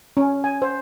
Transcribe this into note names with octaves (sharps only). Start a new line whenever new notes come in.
C#4
G#5
C5